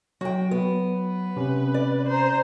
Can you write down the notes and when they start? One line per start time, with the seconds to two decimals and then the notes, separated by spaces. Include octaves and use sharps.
0.21 F#3 F#4 G5
0.51 B3
0.99 B4
1.36 C3 C#4
1.74 D5
2.08 C5 A#5